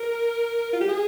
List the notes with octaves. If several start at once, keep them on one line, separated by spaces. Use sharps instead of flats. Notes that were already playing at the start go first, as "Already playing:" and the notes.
Already playing: A#4
F4
G4
G#4